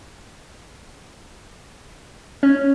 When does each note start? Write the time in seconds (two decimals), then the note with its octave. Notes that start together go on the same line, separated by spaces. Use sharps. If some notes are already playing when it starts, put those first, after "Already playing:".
2.43 C#4